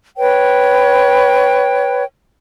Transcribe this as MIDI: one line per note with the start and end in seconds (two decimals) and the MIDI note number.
0.18 2.03 71
0.18 2.03 73
0.18 2.03 79